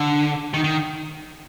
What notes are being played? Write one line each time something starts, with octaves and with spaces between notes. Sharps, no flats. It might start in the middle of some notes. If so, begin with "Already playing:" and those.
Already playing: D3
D#3
D#3